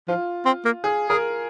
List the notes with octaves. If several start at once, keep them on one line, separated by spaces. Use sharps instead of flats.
F3 F4
C4
A#3
G#4
G#4 A#4